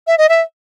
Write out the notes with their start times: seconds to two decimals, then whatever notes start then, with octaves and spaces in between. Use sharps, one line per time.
0.07 E5
0.18 D#5
0.29 E5